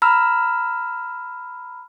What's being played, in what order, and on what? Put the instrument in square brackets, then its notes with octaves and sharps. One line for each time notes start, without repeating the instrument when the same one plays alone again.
[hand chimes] A#5 B5 E6 F6